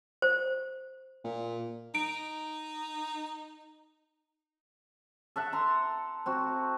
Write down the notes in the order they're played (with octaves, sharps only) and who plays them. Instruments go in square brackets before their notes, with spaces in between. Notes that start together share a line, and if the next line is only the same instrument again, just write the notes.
[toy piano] C5
[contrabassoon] A#2
[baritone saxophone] D#4 [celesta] D7
[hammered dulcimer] A4 E5 F#5
A4 A#5 C6
C4 F#4